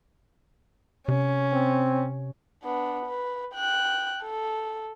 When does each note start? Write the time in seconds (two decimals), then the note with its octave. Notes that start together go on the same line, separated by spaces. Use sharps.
1.08 C3 C#4
1.53 C4
2.64 B3 D4
3.06 B4
3.55 G5 F#6
4.23 A4